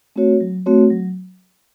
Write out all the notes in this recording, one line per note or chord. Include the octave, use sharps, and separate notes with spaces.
A3 C4 F#4 C#5
F#3
A3 C4 F#4 C#5
F#3